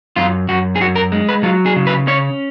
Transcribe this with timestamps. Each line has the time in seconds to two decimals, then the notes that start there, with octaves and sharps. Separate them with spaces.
0.16 F#2 F4
0.49 F#2 F#4
0.76 G#4
0.81 F#2 F#4
0.96 A#4
1.12 G#3
1.29 B4
1.43 F#3 F4
1.66 G#4
1.76 C#3
1.87 B4
2.07 C#4 C#5